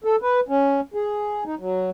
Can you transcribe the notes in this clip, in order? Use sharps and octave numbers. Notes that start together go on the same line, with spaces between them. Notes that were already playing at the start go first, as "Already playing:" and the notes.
A4
B4
C#4
G#4
D#4
F#3